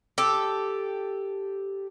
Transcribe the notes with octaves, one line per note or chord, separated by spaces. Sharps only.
G4 A4